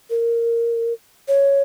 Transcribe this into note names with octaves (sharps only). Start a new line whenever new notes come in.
A#4
C#5